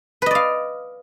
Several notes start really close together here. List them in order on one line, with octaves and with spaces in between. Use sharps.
B4 D#5 D5 F5